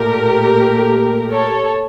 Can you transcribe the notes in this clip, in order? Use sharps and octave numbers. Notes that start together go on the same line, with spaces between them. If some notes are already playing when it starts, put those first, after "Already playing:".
Already playing: A#2 A3 G4 A#4
A4 C#5